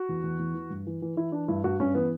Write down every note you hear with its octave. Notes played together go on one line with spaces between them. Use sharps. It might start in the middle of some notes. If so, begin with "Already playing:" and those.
Already playing: F#4
E2
E2
E2
E3
G2
E3
E3
E3 E4
E3 D4
G2 E4
G2 F#4
G2 C#4
E3 B3